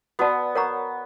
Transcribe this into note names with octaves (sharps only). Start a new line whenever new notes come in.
B3 F#4 B4 D5 F#5 A5
A#4 C#5 F#5 A#5 C#6